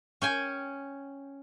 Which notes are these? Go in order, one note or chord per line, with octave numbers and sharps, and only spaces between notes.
C#4 G5 G#5